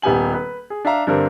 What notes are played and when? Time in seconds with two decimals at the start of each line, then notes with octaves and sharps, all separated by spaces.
0.02 D#1 B3 G4 G#5 F#7
0.34 B4
0.70 G#4
0.85 D4 E5 F5 A#5
1.07 G2 D3 C4 D4 A#4